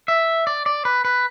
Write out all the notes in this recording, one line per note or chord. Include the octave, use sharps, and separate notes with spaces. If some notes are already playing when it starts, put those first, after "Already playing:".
E5
D5
D5
B4
B4